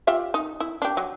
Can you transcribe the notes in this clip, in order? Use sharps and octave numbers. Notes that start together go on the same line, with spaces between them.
F4 G4 E5
D#4
E4
D4 G4
F#3